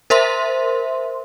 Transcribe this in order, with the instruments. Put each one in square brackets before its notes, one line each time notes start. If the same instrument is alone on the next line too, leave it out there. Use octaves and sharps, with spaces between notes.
[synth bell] A#4 C5 E5 C6